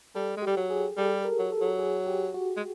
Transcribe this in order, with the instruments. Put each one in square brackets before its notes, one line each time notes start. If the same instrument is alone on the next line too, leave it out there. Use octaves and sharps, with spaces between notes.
[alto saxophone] G3 [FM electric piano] A4
[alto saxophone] G#3
[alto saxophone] G3 [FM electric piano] G4
[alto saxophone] F#3
[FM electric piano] G#4
[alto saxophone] G3 [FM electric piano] A4
[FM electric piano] A#4
[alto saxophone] F#3
[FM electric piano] A4
[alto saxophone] F#3
[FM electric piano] G#4
G4
F#4
[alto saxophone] G#3